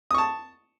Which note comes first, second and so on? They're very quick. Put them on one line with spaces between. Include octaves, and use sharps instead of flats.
D#6 C#6 A5